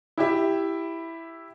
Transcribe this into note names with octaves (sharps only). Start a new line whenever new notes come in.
E4 G4 E5